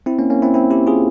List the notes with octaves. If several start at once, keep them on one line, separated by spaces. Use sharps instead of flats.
C4 E4
A#3 C#4
A#3 C#4
C4 E4
C4 E4
E4 G4
F4 G#4